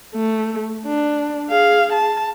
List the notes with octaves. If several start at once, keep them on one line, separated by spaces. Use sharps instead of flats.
A3
D4
G#4 F5
A5